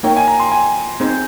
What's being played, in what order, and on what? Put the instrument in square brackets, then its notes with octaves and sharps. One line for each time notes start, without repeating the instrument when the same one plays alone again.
[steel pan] A#3 D#4 A#4 C#5 [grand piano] G5
[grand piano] G#5
A#5
C6
G#5
[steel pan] C4 D#4 G#4 C5